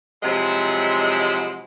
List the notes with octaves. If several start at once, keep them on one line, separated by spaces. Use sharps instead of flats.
C3 F3 F#3 G#3 E4